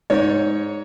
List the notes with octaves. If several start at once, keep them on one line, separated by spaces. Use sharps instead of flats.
G#2 C#5